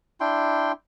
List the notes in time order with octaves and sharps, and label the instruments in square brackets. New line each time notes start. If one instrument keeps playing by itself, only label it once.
[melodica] D4 E4 G5 C6